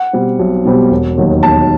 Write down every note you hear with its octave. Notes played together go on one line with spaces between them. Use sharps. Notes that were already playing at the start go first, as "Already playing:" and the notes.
Already playing: F#5
B2 G3 C4
B1
B2 G3 C4
E1
D#2 D#3 F#3
E1 A5